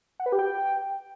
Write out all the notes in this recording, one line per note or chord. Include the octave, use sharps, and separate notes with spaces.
F#5
B4
G4
G5